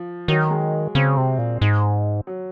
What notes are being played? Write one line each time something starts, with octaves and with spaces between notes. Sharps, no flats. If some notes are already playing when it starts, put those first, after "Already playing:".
Already playing: F3
D#3 F#3
G#3
C#3 C4
C3
A#2
G#2
F#3